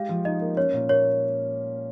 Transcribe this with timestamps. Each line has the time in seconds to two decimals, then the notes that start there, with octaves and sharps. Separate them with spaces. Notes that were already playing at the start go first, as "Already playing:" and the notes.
Already playing: G#3 G4 F5
0.09 F3
0.25 D#4 D#5
0.41 A#3
0.56 C#4 C#5
0.73 A#2
0.89 A#3 C#5